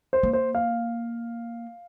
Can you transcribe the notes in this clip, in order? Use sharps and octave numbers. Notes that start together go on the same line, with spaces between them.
C5
A#3
C5
F5